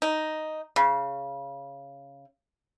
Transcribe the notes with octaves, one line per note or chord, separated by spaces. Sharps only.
D#4
C#3